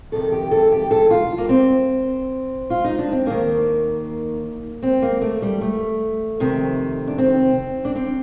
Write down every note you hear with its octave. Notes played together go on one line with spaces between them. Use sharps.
F2 C3 D#3 A4
G4
A4
G4
A4
F4
A#3
C4
F4
D#4
D4
C4
D#2 D#3 A#3
C4
A#3
A3
G3
A3
F2 C3 D#3
D4
C4
D4
C4